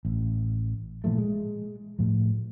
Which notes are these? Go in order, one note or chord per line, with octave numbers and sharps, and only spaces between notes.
A1
A#2 E3 F3 A3
G#3
A2 F3